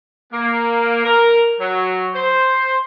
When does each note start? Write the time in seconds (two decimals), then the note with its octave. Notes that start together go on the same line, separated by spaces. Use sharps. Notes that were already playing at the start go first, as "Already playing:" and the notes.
0.32 A#3
1.05 A#4
1.60 F#3
2.14 C5